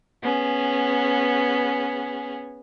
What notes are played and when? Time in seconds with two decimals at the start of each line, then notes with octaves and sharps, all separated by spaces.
0.22 B3 C#4 G#4